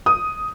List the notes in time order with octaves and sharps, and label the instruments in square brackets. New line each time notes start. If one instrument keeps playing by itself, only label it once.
[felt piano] D#6